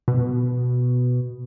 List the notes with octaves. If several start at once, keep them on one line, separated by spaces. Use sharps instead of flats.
B2